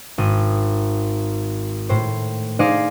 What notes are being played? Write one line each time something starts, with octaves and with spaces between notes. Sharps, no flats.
G#1 D#6
A2 C5
D#4 G#4 C5 D5 D#5 F5